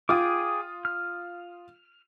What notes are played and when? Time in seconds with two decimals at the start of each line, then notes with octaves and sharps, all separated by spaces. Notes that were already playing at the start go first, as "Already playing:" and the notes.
0.09 F4 G#4 G5 D6 D#6
0.85 F6